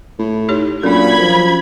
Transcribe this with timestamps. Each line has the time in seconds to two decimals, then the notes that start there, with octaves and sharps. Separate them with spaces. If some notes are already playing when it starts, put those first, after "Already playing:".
0.19 A2
0.49 D#4 G4 C#5
0.83 F#2 A#2 D4 A4 B5 G#6
1.19 F#2 F3